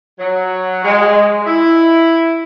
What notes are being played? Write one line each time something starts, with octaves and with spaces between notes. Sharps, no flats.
F#3
G#3
E4